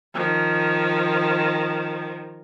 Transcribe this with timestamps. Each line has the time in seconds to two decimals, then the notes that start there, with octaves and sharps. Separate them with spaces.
0.14 D#3 F3